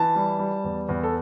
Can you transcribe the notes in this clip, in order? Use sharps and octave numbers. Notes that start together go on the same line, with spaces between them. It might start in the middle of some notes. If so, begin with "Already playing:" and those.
Already playing: E3 A5
G3
G3
E2
E2
A4